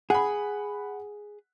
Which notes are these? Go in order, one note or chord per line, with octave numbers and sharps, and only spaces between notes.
G#4 F#5 B5